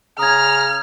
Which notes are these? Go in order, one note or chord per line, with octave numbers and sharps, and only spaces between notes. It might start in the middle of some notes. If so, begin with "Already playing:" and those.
C#3 A#5 D#6 F6 G#6